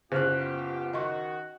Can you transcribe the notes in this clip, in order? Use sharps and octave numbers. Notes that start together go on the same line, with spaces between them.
F#1 B3 F4 G4 C5 F6 F#6
D#3 F#4 D#5 C6 C#6